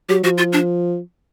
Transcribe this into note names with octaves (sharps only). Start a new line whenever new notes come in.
F#3 G4
F3 F#4
F4
D4